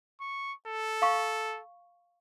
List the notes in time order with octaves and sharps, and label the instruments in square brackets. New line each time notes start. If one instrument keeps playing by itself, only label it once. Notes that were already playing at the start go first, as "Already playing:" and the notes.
[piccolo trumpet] C#6
A4
[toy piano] F5 C#6